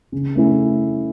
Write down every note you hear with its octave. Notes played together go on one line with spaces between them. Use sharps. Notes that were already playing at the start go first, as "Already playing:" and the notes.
C#3
A3 C#4 E4